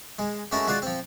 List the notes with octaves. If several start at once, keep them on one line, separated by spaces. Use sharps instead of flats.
G#3
G#3 A3 C#4 F#4 A4 A#4
G#3 F4 F#4 D5 F5
F3 C4